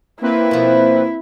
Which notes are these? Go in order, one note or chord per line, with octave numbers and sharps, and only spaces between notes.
A#3 C4 E4 B4
B2 F3